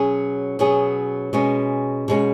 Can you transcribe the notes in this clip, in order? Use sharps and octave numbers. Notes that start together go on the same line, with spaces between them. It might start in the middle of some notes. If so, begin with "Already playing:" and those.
Already playing: B2 F#3 C#4 G#4
B2 F#3 C#4 G#4
B2 G#3 C#4
B2 G#3 C#4